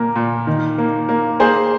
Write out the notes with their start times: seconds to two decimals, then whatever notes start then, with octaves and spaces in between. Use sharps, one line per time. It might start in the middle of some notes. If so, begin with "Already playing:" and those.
Already playing: A#2 A#3 A#4
0.16 A#2
0.47 D#3
0.78 A#3
1.09 A#3
1.40 A#3 G#4 C5